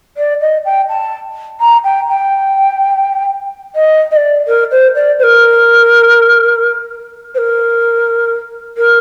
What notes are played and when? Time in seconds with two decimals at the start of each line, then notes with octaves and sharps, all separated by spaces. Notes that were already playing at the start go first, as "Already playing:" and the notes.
0.17 D5
0.41 D#5
0.65 G5
0.89 A5
1.60 A#5
1.84 G5
2.08 G5
3.75 D#5
4.11 D#5
4.16 D5
4.47 A#4
4.71 C5
4.95 D5
5.19 C5
5.23 A#4
7.34 C5
7.38 A#4
8.77 A#4